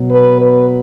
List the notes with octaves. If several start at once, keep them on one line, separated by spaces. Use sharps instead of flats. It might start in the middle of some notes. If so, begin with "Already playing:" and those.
Already playing: B2 F#3
B4
B4